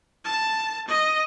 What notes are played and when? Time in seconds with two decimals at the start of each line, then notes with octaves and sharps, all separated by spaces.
0.24 A5
0.87 D#5